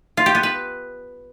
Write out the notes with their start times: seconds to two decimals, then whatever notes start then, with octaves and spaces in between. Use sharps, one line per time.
0.17 F4
0.26 G4
0.35 B3
0.43 B4